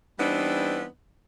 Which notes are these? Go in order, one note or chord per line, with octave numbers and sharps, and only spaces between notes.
E3 G3 B3 C4 D4 D#4